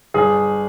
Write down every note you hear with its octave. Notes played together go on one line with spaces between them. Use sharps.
G1 G#4